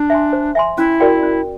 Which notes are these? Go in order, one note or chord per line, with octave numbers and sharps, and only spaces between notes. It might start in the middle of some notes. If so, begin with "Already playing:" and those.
Already playing: D4
E5 G#5 C6
C5
E5 G#5 C6
C#4 E4
F#4 A#4 D5 G5
C#4